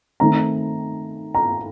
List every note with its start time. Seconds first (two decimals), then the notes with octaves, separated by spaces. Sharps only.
0.20 D#3 A3 C4 A#5
1.35 A#5